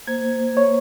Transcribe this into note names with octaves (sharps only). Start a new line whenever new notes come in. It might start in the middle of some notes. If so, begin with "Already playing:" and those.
A#3 C5 G#6
C#5